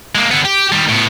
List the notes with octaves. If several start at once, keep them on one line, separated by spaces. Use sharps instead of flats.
G#3 A#3
D3 B3
G4
D#3 G3
A2 B3